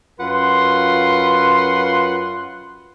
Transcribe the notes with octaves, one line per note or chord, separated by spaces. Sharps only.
F#2 F4 B4 F#5 C6